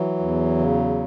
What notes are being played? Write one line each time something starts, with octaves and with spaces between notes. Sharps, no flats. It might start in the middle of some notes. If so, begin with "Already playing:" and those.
Already playing: E3 F#3
E2
C#3